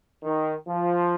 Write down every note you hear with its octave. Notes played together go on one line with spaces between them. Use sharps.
D#3
F3